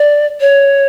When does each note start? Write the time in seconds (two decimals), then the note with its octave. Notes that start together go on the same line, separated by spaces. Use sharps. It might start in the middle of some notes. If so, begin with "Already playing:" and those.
Already playing: D5
0.41 C#5